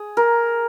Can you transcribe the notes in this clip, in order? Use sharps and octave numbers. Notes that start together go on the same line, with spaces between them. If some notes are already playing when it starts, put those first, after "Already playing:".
Already playing: G#4
A#4